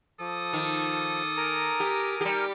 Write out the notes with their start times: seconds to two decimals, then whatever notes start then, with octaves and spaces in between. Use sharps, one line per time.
0.20 F3 A4 D6 D#6
0.53 D#3
1.37 A#4 G#5 A#5
1.80 G4
2.21 G3 G4